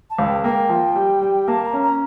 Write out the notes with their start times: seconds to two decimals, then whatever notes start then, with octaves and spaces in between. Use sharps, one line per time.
0.10 A5
0.18 C#2
0.27 G5
0.44 A#3 G5
0.69 F3
0.96 G3
1.22 G3
1.48 A#3 A5
1.65 A#5
1.73 C#4
1.82 A#5